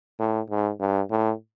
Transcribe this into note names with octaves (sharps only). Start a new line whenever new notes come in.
A2
G#2
G2
A2